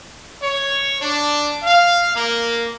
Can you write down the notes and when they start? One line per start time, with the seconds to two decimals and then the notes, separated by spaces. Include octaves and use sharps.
0.42 C#5
1.01 D4
1.63 F5
2.15 A#3